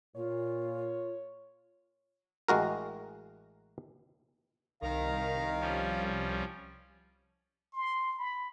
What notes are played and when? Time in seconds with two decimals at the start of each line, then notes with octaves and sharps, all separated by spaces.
0.16 A#2 F4 C#5
2.48 A1 G#3 F#4 A#4
4.82 C2 D#3 F5 A#5
5.60 F3 G3 C#4
7.73 C6
8.18 B5